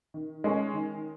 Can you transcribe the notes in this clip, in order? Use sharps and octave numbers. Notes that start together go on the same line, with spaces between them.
D#3
G#3 C#4
D#3